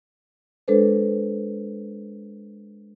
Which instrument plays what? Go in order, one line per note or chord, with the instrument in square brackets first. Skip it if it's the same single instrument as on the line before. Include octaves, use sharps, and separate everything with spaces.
[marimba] G#3 D4 A4 B4 C5